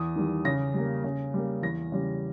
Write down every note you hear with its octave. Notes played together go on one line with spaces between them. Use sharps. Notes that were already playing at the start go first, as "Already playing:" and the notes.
Already playing: E2 D#6
D#3 G3
C#3 A#6
G3 A#3
C#3
G3 A#3
E2 A#6
C#3 G3